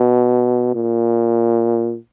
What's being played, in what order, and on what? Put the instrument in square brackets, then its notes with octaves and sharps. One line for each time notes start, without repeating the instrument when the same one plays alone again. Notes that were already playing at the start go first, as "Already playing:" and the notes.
Already playing: [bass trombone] B2
A#2